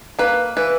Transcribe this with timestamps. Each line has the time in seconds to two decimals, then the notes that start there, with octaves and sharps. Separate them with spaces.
0.19 A#3 B4
0.57 E3 B4